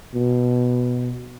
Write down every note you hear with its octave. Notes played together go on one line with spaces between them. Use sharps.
B2